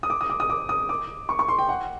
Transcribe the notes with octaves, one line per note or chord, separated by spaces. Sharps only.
D#6
D6
D#6
D6
D#6
D6
D#6
D6
C#6
C#6
C6
G5
F#5